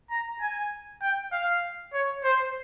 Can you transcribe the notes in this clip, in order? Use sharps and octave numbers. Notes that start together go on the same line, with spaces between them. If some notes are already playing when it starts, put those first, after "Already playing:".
A#5
G#5
G5
F5
C#5
C5